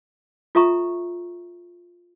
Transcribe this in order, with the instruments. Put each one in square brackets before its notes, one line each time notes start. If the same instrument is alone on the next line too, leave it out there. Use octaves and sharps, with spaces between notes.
[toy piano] F4 A4 E5 A#5 C#6